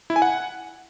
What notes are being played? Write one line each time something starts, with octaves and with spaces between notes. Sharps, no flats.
E4
G#5
F#5